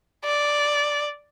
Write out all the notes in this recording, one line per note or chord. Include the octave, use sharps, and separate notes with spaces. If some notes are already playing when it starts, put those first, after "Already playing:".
D5